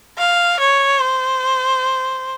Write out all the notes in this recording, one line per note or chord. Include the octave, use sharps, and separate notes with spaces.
F5
C#5
C5